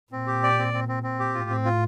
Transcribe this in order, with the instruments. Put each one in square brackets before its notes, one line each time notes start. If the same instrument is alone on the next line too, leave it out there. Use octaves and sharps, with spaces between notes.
[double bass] A#2 [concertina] C4
[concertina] G4
D5
C4
C4
C4
C4
G4
[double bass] A2 [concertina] F4
[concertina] C4
F4